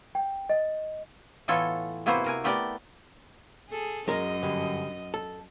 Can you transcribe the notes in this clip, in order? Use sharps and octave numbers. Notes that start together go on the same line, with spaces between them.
G5
D#5
A2 E3 B3 F4 A4 C#5
C3 A#3 B3 E4 F#4 C5
C3 A#4 G#5
A3 B3 G4 A#4 D5 G5
G#4 A4
F#2 G#3 A#4 D#5
G2 D3
A4